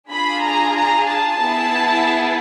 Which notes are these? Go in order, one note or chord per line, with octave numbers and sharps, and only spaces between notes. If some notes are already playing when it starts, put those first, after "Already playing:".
D4 F4 G#4 B5
A#5
A#5
A5
B3 E4 G#4